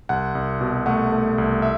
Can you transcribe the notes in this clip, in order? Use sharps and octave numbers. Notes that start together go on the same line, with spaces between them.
C2 F#5
C2
B2
A3 F#5
A3
C2
E5